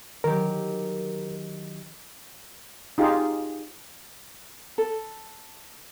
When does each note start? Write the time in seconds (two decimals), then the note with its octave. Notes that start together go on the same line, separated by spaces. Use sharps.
0.24 D#3 F#3 G4 A#4
2.98 D#4 F4 G4 G#4 F5
4.78 A4